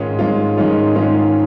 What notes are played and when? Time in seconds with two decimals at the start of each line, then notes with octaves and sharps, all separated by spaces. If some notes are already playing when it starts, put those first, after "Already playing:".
Already playing: G#2 D#3 G#3 C#4 F4
0.19 G#2 D#3 G#3 C#4 F4
0.57 G#2 D#3 G#3 C#4 F4
0.95 G#2 D#3 G#3 C#4 F4